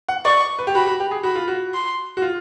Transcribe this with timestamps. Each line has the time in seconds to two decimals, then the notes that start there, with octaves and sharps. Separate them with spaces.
0.08 F#5
0.25 D5 C#6
0.59 B4
0.67 G4
0.75 F#4 B5
0.87 F#4
1.00 G4
1.11 G#4
1.23 F#4 B5
1.35 F4
1.48 F#4
1.74 C6
2.17 F#4
2.22 F4